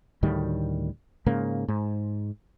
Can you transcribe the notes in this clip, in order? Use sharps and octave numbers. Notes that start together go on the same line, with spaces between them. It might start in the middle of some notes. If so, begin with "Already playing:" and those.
D2 A2 D#3 G3
G#2 C#3 A#3
G#2